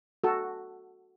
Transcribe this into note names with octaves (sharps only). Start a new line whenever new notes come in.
F#4 A4